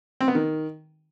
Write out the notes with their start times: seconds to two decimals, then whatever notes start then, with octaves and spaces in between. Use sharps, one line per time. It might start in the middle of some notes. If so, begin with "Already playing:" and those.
0.21 C4
0.28 B3
0.35 D#3